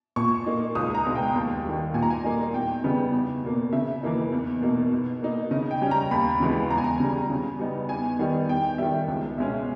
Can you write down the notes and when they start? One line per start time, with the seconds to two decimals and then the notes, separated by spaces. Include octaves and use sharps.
0.16 A#2 C#6
0.46 A#3 D#4
0.75 C#2 D#6
0.95 A#5
1.05 B2 G#3 D#4
1.15 G5
1.36 D#2
1.64 D#3 G3
1.94 A#2 G#5
2.02 A#5
2.10 G#5
2.24 G3 A#3 D#4
2.54 E2 G5
2.83 C#3 G3 B3 D#4
3.13 E2
3.43 B2 A#3
3.73 C#3 E5
4.03 E3 A#3 D#4
4.32 E2
4.62 B2 A#3 D#4
4.92 B2
5.22 A#3 D#4
5.51 C#3 D#5
5.71 G5
5.81 G3 C#4
5.91 A#5
6.11 D#2 B5
6.40 C#3 E3 G#3 B3
6.70 E2 A#5
6.78 G#5
6.84 A#5
7.00 C#3 G3
7.30 C#3
7.59 G3 B3 D#4
7.89 E2 G#5
8.19 D#3 G3 B3 D#4
8.49 E2 G5
8.78 D#3 G3 E5
9.08 C#2
9.37 B2 G#3 C#4 E5